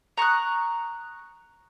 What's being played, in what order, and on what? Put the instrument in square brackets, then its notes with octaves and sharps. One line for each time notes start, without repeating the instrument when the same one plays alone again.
[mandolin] A#5 C#6 D#6 F#6